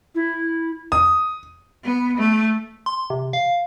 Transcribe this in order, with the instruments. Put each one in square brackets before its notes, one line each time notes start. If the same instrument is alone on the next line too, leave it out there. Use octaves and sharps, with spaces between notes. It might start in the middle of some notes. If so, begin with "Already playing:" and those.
[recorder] E4
[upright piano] D#6
[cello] B3
A3
[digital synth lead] C6
C3
F5